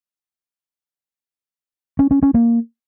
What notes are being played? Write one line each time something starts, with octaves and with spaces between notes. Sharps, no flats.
C#4
C#4
C#4
A#3